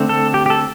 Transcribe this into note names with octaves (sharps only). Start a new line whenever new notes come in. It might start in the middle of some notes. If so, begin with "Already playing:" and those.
Already playing: D3 A3 C4
A4
G4
G4
A4